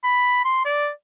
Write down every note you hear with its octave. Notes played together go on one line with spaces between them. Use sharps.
B5
C6
D5